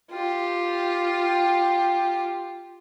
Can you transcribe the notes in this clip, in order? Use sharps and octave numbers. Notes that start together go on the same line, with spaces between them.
F4 G4